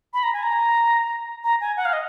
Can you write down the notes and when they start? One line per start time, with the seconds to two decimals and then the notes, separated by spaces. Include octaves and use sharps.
0.14 B5
0.23 A#5
0.33 G#5
0.43 A#5
1.44 A#5
1.61 G#5
1.77 F#5
1.85 F5
1.93 D#5